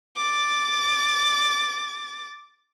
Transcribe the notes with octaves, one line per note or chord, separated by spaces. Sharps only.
D6 A6